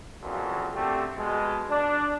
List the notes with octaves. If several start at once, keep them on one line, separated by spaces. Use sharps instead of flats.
F2 A#2 C#3 E3 F#3
D3 A3 C4 G4
B2 G#3
D4